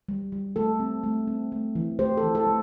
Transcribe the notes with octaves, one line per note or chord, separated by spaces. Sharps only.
G3
G3
A3 A4
C4
A3
C4
A3
E3
A3 G4 C5
A4
E3
A4
A3